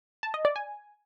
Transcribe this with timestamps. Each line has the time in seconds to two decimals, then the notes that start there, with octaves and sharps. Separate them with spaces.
0.23 A5
0.34 D#5
0.45 D5
0.56 G#5